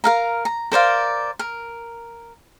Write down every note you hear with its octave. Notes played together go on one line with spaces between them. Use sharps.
A#4 F5 A#5
A#5
A#4 C5 D5 F5
A#4